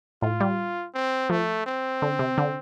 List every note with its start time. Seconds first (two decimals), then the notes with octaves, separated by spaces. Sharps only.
0.22 A2 F4
0.40 G3
0.95 C4
1.30 F3 A3
1.66 C4
2.02 D3
2.19 C3
2.38 D3